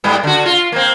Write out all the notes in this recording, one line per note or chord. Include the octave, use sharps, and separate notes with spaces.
G#2 G3 B3
D3 F#4
F4
A#3 C4